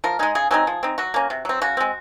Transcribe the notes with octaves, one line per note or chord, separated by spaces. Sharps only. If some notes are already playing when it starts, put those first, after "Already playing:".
F3 A#4
G#3 D#4 G#4
C#3 G#4
F#3 C4 D#4 G#4
F3
C4 D#4
F#3 F#4
A#3 C#4
C3
F#3 C4
C#3 F#4
G#3 C4